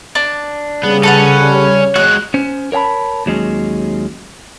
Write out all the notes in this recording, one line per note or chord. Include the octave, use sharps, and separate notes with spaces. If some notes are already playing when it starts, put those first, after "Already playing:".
D4
C#3 G3 B3 G#4
C#4 A4 B4 F#5
C#5
G#3 F#4 F#6
C#4 C5
A#4 C#5 G5 A5 B5
D#2 F#3 G#3 C#4